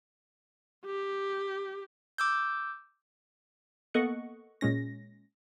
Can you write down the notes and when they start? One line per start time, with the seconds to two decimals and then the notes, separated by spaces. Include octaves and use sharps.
0.86 G4
2.18 D6 E6 G6
3.94 A#3 B3 A4 D#5 F#5 C#6
4.61 A#2 G#3 C#4 A#6